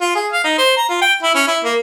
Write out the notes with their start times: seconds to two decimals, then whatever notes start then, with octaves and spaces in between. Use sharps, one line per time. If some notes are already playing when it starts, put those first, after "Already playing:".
0.01 F4
0.15 G#4
0.32 F5
0.44 D#4
0.58 C5
0.77 A#5
0.89 F4
1.01 G5
1.22 E4
1.35 C#4
1.48 E4
1.64 A#3